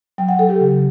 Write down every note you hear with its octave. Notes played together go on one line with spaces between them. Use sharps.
F#3 G5
F#5
F#3 A4
G4
C#3